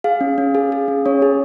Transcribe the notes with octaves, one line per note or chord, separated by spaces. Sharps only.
G#4 F5
C#4
C#4
G#4
G#4
C#4
C#4 C#5
G#4